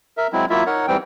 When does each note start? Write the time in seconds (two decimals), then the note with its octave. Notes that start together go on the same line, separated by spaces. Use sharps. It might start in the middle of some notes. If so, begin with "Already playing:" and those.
0.17 A#4 E5
0.33 F#3 G#3 C4 E4
0.50 F#3 A#3 E4 F4 E5
0.67 D#4 A#4 C#5 F#5
0.88 G#2 E3 G3 C4 G5